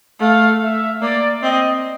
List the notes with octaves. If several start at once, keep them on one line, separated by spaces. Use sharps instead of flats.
A3 F5
E5
A#3 D5
C4 D#5